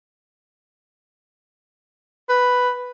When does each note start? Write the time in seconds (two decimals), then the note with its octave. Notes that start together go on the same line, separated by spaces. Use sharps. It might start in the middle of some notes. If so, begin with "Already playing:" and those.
2.29 B4